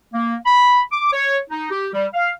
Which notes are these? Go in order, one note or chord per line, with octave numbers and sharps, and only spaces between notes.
A#3
B5
D6
C#5
D#4
G4
G3
F5